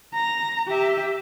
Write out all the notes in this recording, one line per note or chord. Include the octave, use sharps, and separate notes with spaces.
A#5
G4 E5